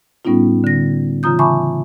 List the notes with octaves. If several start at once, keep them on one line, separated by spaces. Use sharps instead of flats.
A2 G3 B3 C#4 D#4 F4
D3 A#6
C#3 E3 F4 A#5 D#6 G6
E5 G#5 A5 B5 C#6 D6